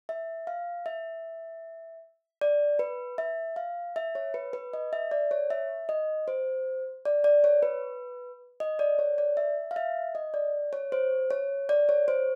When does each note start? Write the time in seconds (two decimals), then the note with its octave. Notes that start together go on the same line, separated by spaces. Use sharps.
0.09 E5
0.47 F5
0.86 E5
2.41 D5
2.79 B4
3.18 E5
3.56 F5
3.96 E5
4.15 C#5
4.34 B4
4.53 B4
4.73 D#5
4.93 E5
5.11 D5
5.31 C#5
5.50 E5
5.89 D#5
6.28 C5
7.05 D5
7.24 D5
7.44 C#5
7.63 B4
8.60 D#5
8.79 D5
8.99 C#5
9.18 D5
9.37 E5
9.71 F5
9.76 E5
10.15 D#5
10.34 D5
10.73 C#5
10.92 C5
11.31 C#5
11.69 D5
11.89 C#5
12.08 C5